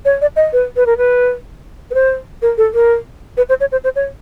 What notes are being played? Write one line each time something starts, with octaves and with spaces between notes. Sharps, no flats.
C#5
D5
D#5
B4
B4
A#4
B4
B4
C5
A#4
A4
A#4
B4
C5
C#5
C5
C5
C#5